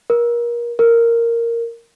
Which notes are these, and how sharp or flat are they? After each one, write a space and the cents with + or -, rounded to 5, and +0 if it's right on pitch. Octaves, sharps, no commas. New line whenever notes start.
A#4 +30
A#4 -5